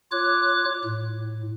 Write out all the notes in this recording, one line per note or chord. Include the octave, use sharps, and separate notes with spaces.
F4 C#5 D6 F#6
A2